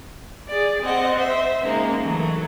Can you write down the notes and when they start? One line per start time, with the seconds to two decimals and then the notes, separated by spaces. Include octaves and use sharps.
0.48 G#4 D5
0.81 C4 D#5 F#5
1.15 C5 E5
1.62 C#3 G#3 A#3 D#4
1.98 E3 F#3 A3